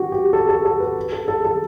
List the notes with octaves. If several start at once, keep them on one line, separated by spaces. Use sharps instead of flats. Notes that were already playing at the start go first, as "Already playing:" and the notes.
Already playing: F#4 G4
G4
A4
A4
A4
B4
A4
A4
A4